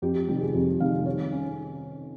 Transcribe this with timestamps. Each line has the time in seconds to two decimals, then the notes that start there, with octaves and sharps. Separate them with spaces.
0.02 F2 G4
0.28 C3 D#3 G3 G4
0.41 G#4
0.54 F2 G4
0.80 C3 D#3 G3 F5
1.06 D#3 C#5
1.32 C#4